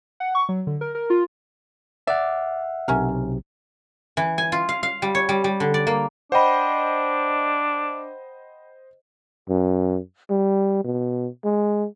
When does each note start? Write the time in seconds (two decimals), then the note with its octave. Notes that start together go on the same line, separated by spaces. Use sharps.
0.20 F#5
0.35 C#6
0.49 F#3
0.67 D3
0.81 A#4
0.95 A#4
1.10 F4
2.07 D5 E5 F#5
2.88 B1 C3 C#4 A#4
4.17 E3
4.38 G#5
4.52 F4
4.69 F5
4.83 F5
5.02 G3
5.15 C#5
5.29 G3
5.44 G3
5.60 D3
5.74 D5
5.87 A#3
6.32 D4 C5 D#5 F#5 G5 B5
9.49 F#2
10.30 G3
10.84 B2
11.44 G#3